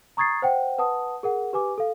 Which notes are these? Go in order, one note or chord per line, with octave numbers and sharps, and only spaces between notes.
A#5 C#6 D#6 G#6 A6 C7
C5 F#5 G5
B4 F#5 A5 D#6
G#4 A#4 F#5
G4 B4 G#5 D6
A4 F5